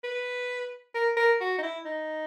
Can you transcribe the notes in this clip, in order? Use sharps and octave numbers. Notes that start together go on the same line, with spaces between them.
B4
A#4
A#4
F#4
D#4
E4
D#4